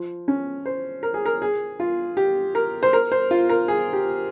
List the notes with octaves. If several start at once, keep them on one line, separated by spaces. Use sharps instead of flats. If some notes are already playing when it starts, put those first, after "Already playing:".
Already playing: F3
C#4
C5
A#4
G#4
A#4
G#4
F4
G4
A#4
C5
A#4
C5
F4
A#4
G#4
G4